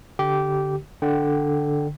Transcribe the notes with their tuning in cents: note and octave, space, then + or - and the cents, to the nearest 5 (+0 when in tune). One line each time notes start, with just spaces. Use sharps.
D3 -15 G4 -15
D3 +0 G5 -20